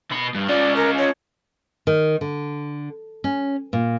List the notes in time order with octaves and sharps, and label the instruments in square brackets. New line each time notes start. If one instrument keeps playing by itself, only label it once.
[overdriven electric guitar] B2 B5
G2
[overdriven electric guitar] C#4 F4 [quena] D5
[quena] A#4
C#5
[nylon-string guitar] D#3
D3
C#4
A#2